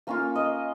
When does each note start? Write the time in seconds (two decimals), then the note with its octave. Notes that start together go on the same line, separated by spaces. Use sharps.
0.07 A#3 C#4 F4 F5
0.35 D#5